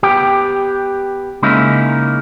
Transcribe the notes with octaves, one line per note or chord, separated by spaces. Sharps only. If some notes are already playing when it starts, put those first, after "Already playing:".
B3 G4 G5
C#3 G#3 A#3 C#4 D#4 E4